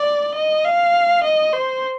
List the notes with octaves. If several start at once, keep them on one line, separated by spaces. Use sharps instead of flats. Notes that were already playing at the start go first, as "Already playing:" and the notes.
Already playing: D5
D#5
F5
D#5
C5